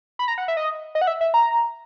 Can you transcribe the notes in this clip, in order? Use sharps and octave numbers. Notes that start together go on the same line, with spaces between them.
B5
A#5
F#5
E5
D#5
D#5
F#5
E5
E5
A#5